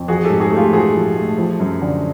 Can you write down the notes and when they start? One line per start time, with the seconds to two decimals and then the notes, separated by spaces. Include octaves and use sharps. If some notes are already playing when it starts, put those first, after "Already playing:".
Already playing: F2
0.08 F3 F#4 G#4
0.24 G4 A4
0.30 G#2
0.40 F#4 G#4
0.51 A3
0.56 F4 G4
0.73 F3 F#4 G#4
0.95 F3
1.16 A3
1.38 F3
1.59 F#2
1.82 D3